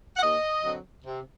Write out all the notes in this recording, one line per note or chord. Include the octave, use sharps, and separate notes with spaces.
F#5
D#2 D#5
D3 F#3 C4
C3